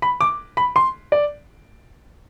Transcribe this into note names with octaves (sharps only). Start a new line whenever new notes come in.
B5
D6
B5
C6
D5